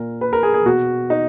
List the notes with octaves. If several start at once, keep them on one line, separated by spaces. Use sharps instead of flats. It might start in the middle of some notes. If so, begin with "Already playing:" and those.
Already playing: A#2 A#4
B4
A#4
G#4
G#4
B2 F#4
D#4